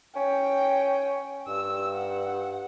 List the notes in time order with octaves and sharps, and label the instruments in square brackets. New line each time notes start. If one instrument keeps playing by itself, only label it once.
[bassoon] C#4 [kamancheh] G5
[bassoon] G2 [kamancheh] E6
[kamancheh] F#5